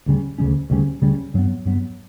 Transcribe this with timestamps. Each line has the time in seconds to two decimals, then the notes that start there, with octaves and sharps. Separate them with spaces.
0.06 D2 C#3 G3 C#4
0.38 D2 C#3 G3 C#4
0.70 D2 C#3 G3 C#4
1.02 D2 C#3 G3 C#4
1.34 G2 F#3 B3
1.65 G2 F#3 B3